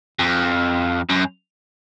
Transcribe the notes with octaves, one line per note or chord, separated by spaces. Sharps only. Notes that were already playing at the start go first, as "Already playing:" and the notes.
F2
F#2